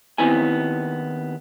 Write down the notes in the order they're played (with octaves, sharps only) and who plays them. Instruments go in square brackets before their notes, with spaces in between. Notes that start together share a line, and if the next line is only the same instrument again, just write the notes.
[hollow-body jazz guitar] D#2 B3 C4 E4 G#5